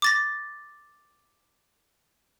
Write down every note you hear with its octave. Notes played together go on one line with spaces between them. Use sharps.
D6 A6 A#6